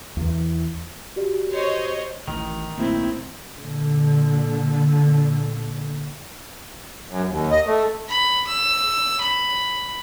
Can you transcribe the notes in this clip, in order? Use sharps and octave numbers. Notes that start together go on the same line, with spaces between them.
E2 E3
F#4 G4 D5
C5 C#5 D#5
A1 D#3
A#1 A3 A#3 C4 E4
A#2 D3
F#2
D#2
D#5
A3
B5
E6
B5